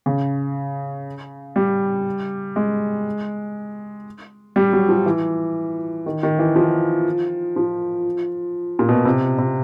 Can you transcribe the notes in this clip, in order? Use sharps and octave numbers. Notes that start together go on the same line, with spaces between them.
C#3
G3
G#3
G3
F#3
F3
E3
D#3
D#3
E3
F3
F3
A#2
B2
C3
C3